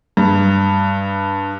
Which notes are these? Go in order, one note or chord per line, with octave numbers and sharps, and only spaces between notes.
G2